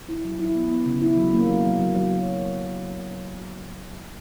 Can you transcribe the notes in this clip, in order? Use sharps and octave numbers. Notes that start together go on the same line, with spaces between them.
E4
F#3
E4
B3
B3
C#3
E4
F#3
A#3
F#3
F#3
F#3
F#3